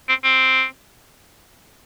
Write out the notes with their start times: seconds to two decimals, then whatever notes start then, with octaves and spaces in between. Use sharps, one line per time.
0.09 C4
0.24 C4